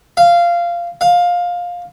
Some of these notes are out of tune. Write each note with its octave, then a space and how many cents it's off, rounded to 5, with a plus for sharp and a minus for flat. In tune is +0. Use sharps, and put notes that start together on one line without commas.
F5 -15
F5 +15